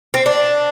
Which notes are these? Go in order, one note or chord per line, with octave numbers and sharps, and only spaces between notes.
C4
D4